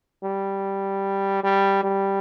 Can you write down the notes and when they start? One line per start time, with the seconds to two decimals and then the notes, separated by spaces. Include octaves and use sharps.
0.24 G3
1.44 G3
1.83 G3